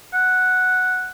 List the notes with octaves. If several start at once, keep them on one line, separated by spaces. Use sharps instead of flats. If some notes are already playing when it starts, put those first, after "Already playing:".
F#5